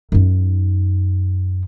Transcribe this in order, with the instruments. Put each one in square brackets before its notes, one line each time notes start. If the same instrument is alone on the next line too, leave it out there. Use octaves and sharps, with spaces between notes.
[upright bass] F#2 D#4